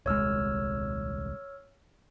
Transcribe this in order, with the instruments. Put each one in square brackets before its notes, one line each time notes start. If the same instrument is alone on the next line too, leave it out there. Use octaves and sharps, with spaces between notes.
[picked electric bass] D#1 C2 G#3 [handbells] C#5 E6 F6